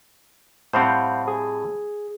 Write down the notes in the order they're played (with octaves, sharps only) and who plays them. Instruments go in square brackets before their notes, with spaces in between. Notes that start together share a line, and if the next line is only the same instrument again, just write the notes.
[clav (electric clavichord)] A2 G3 C4 [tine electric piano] C5 F5 F#5
[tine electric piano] G#4